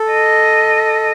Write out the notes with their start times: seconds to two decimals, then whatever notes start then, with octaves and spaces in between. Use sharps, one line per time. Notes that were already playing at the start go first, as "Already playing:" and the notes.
Already playing: A4
0.11 D#5